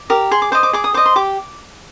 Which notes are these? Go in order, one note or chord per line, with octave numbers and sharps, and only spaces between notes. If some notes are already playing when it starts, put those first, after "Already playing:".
Already playing: D6
G4 A#4
G#4 C6
D6
C5 D#5 D6
D6
G#4 D6
D#6
C5 D#5 D6
C6
G4 D6